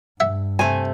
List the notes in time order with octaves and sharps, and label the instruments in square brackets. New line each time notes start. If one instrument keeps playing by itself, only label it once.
[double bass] G2 [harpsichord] E5 F#5
[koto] C3 A3 [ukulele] G#5